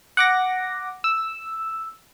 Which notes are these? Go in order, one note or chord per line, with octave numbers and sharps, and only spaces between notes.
F#5 D6 A#6
E6